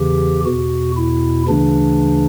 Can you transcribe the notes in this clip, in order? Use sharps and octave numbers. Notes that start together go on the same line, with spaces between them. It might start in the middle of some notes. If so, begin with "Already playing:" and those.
Already playing: E2 C#3 E3 G4
E2 B2 F#4
E4
D2 C#3 E3 D4